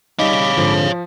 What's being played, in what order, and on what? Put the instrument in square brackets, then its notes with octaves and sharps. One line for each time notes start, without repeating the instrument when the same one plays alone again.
[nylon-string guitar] G3 D#4 [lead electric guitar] C#5 F5 [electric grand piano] D#5 [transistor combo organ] B5 D6
[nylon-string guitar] G#2 D3 [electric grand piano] F3